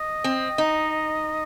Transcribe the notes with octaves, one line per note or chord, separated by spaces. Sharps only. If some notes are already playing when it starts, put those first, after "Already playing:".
Already playing: D#5
C4
D#4